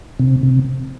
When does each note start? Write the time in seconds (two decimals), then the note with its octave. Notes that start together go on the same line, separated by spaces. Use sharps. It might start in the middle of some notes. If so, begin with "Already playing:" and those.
0.19 C3
0.43 C3